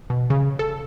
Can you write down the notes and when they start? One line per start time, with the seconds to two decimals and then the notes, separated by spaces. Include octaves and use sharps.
0.10 B2
0.30 C#3
0.59 A4